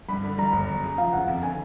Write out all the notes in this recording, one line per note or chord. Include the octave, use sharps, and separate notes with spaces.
G2 B5
D3
G3 A#5
G1
F#2
C#3
F3 F5
F#1 F#5
F2
D3 G#5